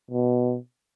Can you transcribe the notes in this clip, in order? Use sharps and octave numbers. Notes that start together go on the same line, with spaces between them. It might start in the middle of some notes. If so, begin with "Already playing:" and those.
B2